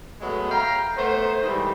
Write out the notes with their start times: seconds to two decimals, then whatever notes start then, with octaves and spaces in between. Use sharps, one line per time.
0.21 F#3 G#3 A3 B3
0.50 F5 G5 A#5
0.97 A3 B3 C5
1.42 G#2 D#3 E3 G3